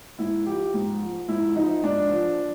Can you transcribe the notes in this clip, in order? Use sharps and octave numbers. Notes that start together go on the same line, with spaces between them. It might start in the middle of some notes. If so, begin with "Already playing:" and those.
G#2 E4
F3 G4
G#2
F3
G#2 E4
F3 D#4
G#2 D4
F3